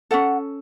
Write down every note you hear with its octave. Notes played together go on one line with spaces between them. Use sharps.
C#4 F#4 A4 F#5